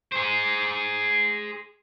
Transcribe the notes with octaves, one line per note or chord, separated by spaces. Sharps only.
G#4 C5